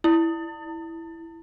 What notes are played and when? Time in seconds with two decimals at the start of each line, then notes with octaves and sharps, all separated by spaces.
0.04 E4